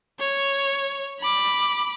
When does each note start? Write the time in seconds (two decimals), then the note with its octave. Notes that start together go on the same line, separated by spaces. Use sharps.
0.20 C#5
1.20 B5 D6